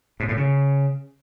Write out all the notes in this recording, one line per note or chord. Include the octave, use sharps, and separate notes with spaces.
G#2
A2
C#3